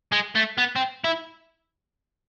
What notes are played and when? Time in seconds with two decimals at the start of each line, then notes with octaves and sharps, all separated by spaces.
0.12 G#3
0.35 A3
0.58 B3
0.76 C4
1.04 E4